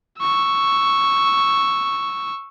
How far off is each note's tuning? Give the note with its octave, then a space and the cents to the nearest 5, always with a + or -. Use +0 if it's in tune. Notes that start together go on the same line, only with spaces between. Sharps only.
C#6 +0 E6 +0